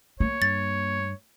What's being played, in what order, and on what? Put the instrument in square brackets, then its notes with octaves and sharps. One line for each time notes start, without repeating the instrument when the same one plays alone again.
[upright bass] A#3 [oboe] C#5
[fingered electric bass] G2 [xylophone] A6